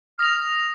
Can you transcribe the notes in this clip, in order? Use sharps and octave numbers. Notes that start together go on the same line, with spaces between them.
D#6 F6 A#6 F7